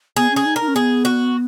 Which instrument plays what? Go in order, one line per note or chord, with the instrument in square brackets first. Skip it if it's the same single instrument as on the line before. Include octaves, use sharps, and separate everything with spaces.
[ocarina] B3 [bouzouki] G#4
[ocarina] C#4 [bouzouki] G#4
[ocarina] D#4
[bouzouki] A#4
[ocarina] D#4
C#4
[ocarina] B3 [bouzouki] G#4
[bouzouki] F#4